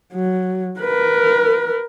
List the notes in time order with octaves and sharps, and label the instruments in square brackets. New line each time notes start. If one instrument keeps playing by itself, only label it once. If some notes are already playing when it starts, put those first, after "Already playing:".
[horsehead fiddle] F#3
A#4 B4